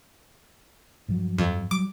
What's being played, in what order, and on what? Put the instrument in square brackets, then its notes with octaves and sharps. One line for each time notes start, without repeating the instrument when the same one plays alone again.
[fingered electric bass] G2 F3 F#3
[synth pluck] F2
[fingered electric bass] F#3 G3 [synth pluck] D6